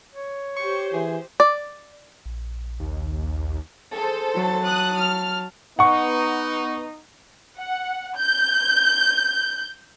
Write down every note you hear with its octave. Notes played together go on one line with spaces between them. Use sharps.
C#5
G4 C5 C#6
E3 G#4
D5
A#1
D#2
G#4 A4 C5
F#3 A5
D#6 F#6
F6
B3 D#4 F#5 C#6
F#5
G6